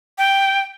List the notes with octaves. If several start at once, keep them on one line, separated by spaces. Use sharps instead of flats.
G5